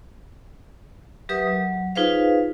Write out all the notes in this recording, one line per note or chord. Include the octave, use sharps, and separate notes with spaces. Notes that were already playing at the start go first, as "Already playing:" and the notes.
F#3 G4 A#4 B4 E5 D#6
F#3
D#4 F4 G#4 B4 C5 F5